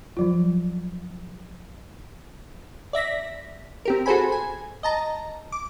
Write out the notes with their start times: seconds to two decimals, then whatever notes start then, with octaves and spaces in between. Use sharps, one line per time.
0.17 F3 F#3 F4
2.93 D5 E5 A#6 B6
3.85 C4 G4 A#4
4.06 F#4 G#4 A4 C5 G#5 B5
4.32 G#5
4.83 D#5 A5 A#5
5.52 D6